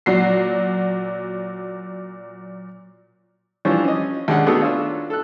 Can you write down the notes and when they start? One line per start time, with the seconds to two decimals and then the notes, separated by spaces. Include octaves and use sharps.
0.06 A#2 F#3 C7
3.65 E3 F3 G3 D4 C5 C#5
3.84 C#4 D#5
4.28 D#2 G#3 C#4 D4 F#5
4.46 A3 B3 D#4 F#4 G#4 A4
4.61 D4 F4 C#5 E6
5.10 A4 F#6